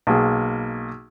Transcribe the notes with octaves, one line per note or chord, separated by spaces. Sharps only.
B1 A#3 G#4